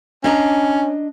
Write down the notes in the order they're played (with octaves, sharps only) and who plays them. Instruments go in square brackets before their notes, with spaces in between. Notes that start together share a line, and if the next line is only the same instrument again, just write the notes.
[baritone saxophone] C#4 [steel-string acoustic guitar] D4 D#5 A#5